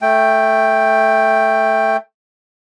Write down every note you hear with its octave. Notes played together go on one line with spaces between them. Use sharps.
A3 G5